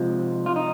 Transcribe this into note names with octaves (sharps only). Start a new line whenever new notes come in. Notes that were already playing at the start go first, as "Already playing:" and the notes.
Already playing: C3 F3 G#3
F4
D#4